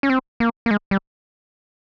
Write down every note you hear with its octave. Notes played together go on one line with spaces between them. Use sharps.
C#4
C4
A#3
A#3
G#3
G3